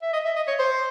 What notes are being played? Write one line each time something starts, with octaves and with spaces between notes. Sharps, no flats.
E5
D#5
E5
D#5
C#5
C5